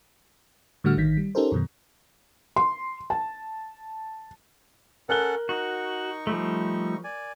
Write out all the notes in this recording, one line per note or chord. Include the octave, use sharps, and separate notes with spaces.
A2 D3 G3 A3 F#4 F6
A1 D#3 B6
G3
C#4 D#4 G4 A4 A#4 C5
F#2 B2 D#3
C6
A5
C#4 A4 A#4 F#5 F#6 G7
D#4 F#4 C#6
F3 G3 A3
D5 G#5